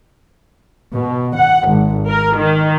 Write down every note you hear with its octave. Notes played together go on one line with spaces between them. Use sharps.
B2
F#5
G#1
A#4
D#3